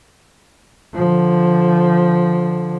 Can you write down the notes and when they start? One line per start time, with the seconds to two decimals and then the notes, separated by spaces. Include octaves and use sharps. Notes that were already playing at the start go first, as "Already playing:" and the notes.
0.94 D3 F3